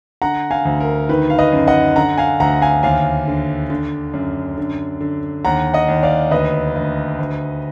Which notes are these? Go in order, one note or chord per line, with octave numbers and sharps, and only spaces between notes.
D3 F#5 A#5
F5 G#5
D2
A#4
D#3 B4
F5
B4 D#5
F#2
D#5 F#5
D3 F#5 A#5
F5 G#5
D2 F#5 A#5
F5 G#5
D#2 F5 G#5
D3
D3
F#2
D3
D3
D#2 F#5 A#5
D#5 F#5
D#2
D5 F5
D2 B4 D#5
D2
D2